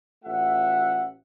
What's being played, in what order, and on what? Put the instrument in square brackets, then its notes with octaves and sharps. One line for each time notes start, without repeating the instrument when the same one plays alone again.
[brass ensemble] A1 A3 F4 E5 F#5